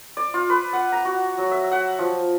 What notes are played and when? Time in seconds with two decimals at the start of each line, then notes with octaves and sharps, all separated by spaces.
0.17 D5
0.34 F4
0.50 B4
0.73 F#5
0.92 A#5
1.05 F#4
1.38 F#3
1.51 E5
1.71 F#5
1.99 F3